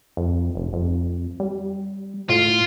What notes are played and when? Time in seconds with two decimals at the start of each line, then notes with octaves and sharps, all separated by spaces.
0.17 F2
0.55 F1
0.73 F2
1.40 G3
2.29 A2 F4